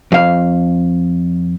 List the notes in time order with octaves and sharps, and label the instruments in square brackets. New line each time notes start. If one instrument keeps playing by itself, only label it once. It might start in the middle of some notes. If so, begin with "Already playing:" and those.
[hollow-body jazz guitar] F2 F5